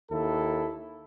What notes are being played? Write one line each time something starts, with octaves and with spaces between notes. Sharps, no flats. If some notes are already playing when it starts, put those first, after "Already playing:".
D#2 E4 A4